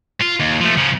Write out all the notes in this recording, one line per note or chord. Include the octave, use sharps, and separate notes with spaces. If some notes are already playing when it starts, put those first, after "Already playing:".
F4
D#2
F3 A3
C#3 F3